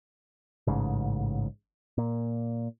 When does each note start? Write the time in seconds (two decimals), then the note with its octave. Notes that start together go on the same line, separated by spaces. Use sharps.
0.67 A1 G#2 C#3
1.98 A#2